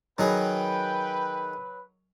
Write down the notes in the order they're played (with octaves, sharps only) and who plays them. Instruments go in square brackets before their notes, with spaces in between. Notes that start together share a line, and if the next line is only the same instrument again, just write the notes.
[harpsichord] D#3 D#4 G#4 [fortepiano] F#3 [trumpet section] B4 [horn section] G5